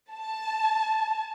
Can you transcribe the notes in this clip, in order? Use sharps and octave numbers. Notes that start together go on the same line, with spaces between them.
A5